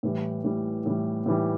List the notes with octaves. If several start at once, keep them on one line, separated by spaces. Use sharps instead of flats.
A2 E3 G3
A2 E3 G3
A2 E3 G3
A2 E3 G3